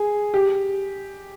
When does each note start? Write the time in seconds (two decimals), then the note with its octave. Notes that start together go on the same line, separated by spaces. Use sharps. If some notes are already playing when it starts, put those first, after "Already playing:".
Already playing: G#4
0.34 G4